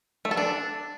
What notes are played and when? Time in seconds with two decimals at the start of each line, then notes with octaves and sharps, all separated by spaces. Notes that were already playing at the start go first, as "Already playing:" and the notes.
0.25 A3
0.31 A4
0.37 D4